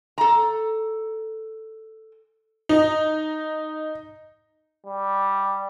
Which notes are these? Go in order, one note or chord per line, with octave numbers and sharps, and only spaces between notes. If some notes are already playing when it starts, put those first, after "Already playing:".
A4 A#5
D#4
G3